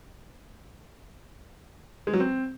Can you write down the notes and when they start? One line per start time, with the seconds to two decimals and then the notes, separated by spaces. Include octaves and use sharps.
2.07 G#3
2.13 F#3
2.20 C4